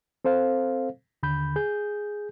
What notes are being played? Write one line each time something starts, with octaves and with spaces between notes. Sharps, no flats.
C4 A4 C5 F5
D#2 D3 B5 G6
G#4 G6